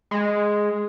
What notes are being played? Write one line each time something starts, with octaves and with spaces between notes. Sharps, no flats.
G#3